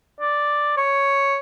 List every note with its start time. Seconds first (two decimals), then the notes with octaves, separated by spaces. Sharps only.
0.20 D5
0.77 C#5